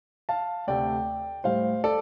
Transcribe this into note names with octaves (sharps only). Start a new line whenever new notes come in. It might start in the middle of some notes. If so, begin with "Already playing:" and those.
F5 A5
D2 C3 A3 D5 G5
A2 G3 C5 F5
A4 D5